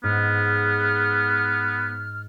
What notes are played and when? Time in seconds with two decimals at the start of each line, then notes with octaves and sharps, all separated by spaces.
0.04 G#2 B3 F6